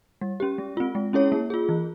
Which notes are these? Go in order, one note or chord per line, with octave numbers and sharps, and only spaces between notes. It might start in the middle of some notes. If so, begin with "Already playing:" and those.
G3
C#4 G4
G#3
C4 F4
G#3
C#4 E4 G#4 C#5
A#3
F4 G#4
E3